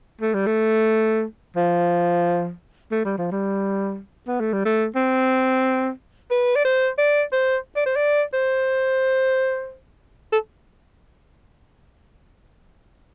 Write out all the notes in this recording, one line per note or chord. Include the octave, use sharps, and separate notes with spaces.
A3
G3
A3
F3
A3
G3
F3
G3
B3
A3
G3
A3
C4
B4
D5
C5
D5
C5
D5
C5
D5
C5
A4